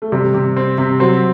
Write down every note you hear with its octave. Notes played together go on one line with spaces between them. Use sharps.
A3
C3 G3
C3
C4
C3
F#3 C4